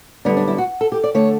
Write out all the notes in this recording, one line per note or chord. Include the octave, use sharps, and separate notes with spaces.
F#2 D3 G3 B3 D4
D4
E4
F#4
A4
G4
D5
D3 A3 C#5